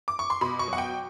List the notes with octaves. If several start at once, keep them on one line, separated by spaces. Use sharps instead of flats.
D6
C#6
C6
B2 B5
C#6
F#3 F#5
G5